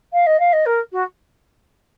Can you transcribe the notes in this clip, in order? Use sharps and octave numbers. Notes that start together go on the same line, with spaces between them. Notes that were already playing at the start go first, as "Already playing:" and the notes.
F5
D#5
F5
D#5
A#4
F#4